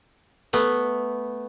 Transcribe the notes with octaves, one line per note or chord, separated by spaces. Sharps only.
A3 B3